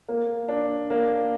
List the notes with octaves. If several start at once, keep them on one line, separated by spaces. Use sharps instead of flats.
A#3
D4
A#3